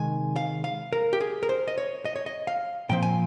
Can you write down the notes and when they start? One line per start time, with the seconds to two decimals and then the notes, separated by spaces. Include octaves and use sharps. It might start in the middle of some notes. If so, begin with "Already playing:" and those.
Already playing: C3 D#3 G#3 G#5
0.36 F5
0.64 F5
0.93 A#4
1.13 G4
1.21 G#4
1.43 A#4
1.49 C5
1.68 D#5
1.78 C#5
2.05 D#5
2.16 C#5
2.26 D#5
2.47 F5
2.89 A#2 F3 C4 G5
3.03 G#5